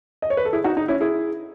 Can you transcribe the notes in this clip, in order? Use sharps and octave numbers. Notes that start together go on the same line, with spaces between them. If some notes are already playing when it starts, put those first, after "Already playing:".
D#5
C#5
B4
A4
E4 G#4
D#4 F#4
D#4
C#4 E4
E4 G#4